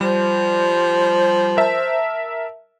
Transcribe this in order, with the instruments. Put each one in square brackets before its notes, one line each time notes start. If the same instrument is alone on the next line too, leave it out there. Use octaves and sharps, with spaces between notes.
[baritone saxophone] F3 [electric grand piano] G3 [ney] C5
[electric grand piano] A#4 E5 A5